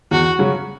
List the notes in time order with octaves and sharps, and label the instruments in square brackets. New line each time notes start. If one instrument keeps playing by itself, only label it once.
[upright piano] E2 [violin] F#4
[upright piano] C#3 F#3 C#4 F#4